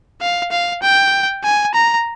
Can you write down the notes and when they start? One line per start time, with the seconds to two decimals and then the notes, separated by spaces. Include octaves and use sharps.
0.21 F5
0.51 F5
0.82 G5
1.44 G#5
1.74 A#5